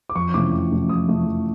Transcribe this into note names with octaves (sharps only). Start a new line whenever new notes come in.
D6
F2 C#6
C3 E3 A3 C#4 D6
F2
C3 E3 A3 C#4
F2 D#6
C3 E3 A3 C#4
F2